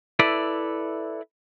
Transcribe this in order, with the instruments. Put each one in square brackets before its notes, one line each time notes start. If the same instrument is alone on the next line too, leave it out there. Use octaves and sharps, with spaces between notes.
[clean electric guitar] E4 A4 B4 D5